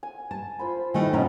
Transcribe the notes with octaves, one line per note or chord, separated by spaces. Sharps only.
G#5
A5
F4 C5 B5
D#3 A3 E4 G#5
B2 C#4 F4 F#4 D#5 A#5